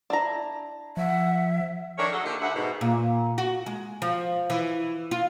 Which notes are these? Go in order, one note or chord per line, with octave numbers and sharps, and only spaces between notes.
D4 E4 A#5
F3 E5 F#5
D#3 A3 D4 A#4 C#5
F#3 G#4 A4
D3 F3 A#3 D#4 F4 G4
D2 E5 F#5
G#2 B2
A#2
F#4
G#3
F3
E3
F4